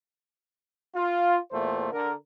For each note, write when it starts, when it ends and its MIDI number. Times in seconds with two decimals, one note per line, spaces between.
0.95 1.37 65
1.52 1.91 40
1.52 1.91 46
1.52 1.91 57
1.52 1.91 72
1.92 2.12 50
1.92 2.12 70